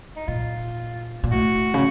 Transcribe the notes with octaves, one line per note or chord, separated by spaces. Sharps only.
D#4
A#2 F4
A#2
A2 F#4
C#3